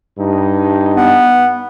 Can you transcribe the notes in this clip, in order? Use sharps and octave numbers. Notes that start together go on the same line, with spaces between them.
G2 D#4
B3